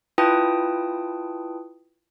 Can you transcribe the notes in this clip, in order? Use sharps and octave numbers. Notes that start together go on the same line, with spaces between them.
E4 F4 B4 G5 A5 D#6